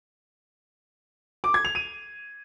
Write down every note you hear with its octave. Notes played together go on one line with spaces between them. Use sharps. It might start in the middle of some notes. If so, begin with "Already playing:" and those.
D6
G#6
F7
D#7